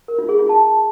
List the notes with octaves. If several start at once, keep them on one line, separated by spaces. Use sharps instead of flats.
A#4
F4
G#4
F4
A5